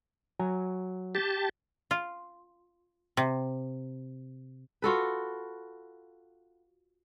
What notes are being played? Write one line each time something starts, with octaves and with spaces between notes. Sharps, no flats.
F#3 G#5 A#5
G4 A5
F4
C3
F4 F#4 A4 B4